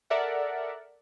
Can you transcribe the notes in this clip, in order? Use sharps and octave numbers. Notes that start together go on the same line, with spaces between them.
A4 A#4 D5 E5 F#5